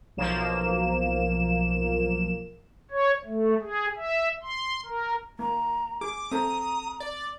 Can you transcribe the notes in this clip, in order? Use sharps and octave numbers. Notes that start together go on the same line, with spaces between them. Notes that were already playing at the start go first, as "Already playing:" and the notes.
B1 F3 A#3 E7
C#5
A3
G#4
E5
C6
A#4
A#3 A#5
G#4 D6
C4 A4 A#5 D#6
D5